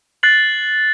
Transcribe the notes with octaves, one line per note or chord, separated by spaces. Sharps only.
F#6 A6 C7 F#7